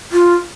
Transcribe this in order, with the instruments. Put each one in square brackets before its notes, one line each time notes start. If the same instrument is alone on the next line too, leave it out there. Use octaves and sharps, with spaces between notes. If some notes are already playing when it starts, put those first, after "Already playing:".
[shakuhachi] F4